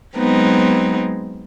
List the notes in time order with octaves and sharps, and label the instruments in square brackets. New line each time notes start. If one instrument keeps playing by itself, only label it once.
[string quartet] F#3 G#3 B3 C4 D#4